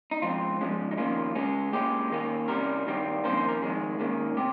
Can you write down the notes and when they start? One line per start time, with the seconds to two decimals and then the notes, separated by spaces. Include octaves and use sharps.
0.11 D#4
0.22 G#2 F3 C4 F4
0.61 G#2 F3 G#3 C#4
0.91 D#4
0.97 F2 D#3 A#3 C#4 F4
1.35 C#2 C#3 G#3 C#4
1.73 A#2 G#3 C#4 G4
2.11 D#2 D#3 A#3 C#4
2.48 C3 G3 C#4 A#4
2.86 G2 D#3 G3 C4
3.24 F2 C3 D#3 A#3 C#4 C5
3.37 C5
3.48 A#4
3.62 F2 D#3 G#3 G#4
3.99 G#2 D#3 A#3 C#4
4.37 C3 G4